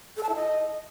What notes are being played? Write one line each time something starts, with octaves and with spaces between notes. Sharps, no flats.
A4
A5
E4
D#5